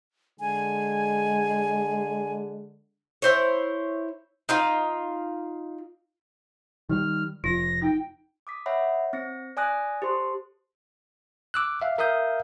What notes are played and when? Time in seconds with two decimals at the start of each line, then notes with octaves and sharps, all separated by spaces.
0.40 D3 G#3 G#5
3.22 E4 C5 C#5
4.49 D#4 F4 F5
6.89 D#3 F3 G3 F6
7.44 F1 F4 A#6
7.82 D#4 G5
8.47 D6 D#6 B6
8.66 C#5 E5 F#5 B5
9.13 C4 A#6 C#7
9.57 D5 G#5 D#6 F#6 A#6
10.02 G4 A4 C5 C6
11.54 D6 E6 F#6
11.82 E5 F5
11.98 A#4 E5 F5 D#6 G6